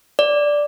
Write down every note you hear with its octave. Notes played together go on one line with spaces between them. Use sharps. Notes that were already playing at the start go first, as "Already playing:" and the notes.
D5